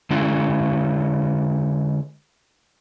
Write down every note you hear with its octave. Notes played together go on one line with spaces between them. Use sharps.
D3 G#3 C#4 E4